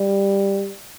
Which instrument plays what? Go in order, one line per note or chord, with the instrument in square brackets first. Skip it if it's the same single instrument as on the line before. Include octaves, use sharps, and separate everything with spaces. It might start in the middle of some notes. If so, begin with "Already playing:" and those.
Already playing: [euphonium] G3